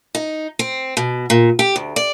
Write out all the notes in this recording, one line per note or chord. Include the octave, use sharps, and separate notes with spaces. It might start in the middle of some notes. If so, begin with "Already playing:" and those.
D#4
C4
B2
A#2
G4
D2
D5